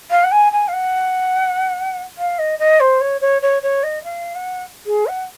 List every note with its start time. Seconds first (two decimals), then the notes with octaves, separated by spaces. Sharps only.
0.10 F5
0.23 F#5
0.31 G#5
0.52 G#5
0.68 F5
0.73 F#5
2.17 F5
2.38 D#5
2.59 D#5
2.80 C5
3.00 C#5
3.21 C#5
3.42 C#5
3.62 C#5
3.83 D#5
4.04 F5
4.35 F#5
4.86 G#4
5.06 F#5